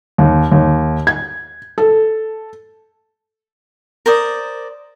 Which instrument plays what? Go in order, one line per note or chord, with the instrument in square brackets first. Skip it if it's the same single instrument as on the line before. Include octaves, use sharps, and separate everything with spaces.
[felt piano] D#2
D#2
G#6
A4
[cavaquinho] A#4 C5 D5 D#6